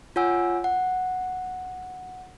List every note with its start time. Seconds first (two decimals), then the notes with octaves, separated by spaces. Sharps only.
0.16 F4 C#5 F#5 G#5 E6
0.64 F#5